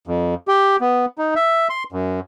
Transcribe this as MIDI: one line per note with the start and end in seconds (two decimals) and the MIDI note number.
0.07 0.35 41
0.48 0.76 67
0.80 1.05 59
1.18 1.34 63
1.36 1.68 76
1.70 1.84 84
1.92 2.20 42